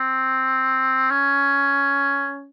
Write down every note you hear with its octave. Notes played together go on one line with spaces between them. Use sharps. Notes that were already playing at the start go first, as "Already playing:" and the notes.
Already playing: C4
C#4